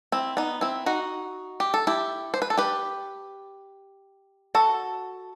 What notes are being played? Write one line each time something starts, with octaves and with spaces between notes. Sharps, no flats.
C4 E4
B3 D#4
C4 E4
D#4 F#4
G4
A4
E4 G4
C5
B4
A4
G4 B4
F#4 A4